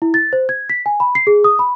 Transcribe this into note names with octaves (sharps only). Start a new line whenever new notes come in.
E4
A6
C5
G#6
B6
G#5
B5
C7
G#4
D#6
B5